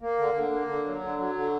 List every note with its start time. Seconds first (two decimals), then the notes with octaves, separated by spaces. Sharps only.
0.01 A#3
0.18 D3
0.34 D3
0.51 A#3
0.67 D3
0.85 F#3
1.01 D3
1.19 F#3
1.35 D3